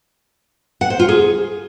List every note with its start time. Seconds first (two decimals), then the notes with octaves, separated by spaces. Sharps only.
0.81 F#5
0.90 C5
0.99 F4
1.09 G#4